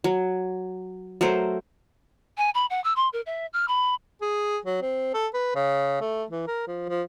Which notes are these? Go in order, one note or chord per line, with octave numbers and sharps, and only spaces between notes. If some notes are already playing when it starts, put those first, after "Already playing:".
F#3
F#3 A3 A#4 C5
G#5
B5
F#5
E6
C6
A#4
E5
F6
B5
G#4
F#3
C4
A4
B4
C#3
A3
E3
A#4
F3
F3